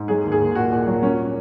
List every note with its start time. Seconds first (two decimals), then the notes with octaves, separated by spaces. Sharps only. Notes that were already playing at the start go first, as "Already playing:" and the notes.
Already playing: G#2
0.08 F#3 G#4
0.24 D#2
0.32 G#4
0.40 D#2
0.55 A#2 F#4
0.71 A#2
0.87 F#3
1.02 F#3 C#4